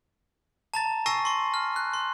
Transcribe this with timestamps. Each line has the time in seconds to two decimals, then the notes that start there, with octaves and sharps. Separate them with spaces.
0.74 A5 A#5 A6
1.06 G#5 C#6 E6 A#6 C7 D#7
1.25 C6 C#6
1.54 F6
1.76 F#6
1.93 C6